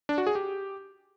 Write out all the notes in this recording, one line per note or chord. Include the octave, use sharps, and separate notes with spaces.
D4
F#4
G#4
G4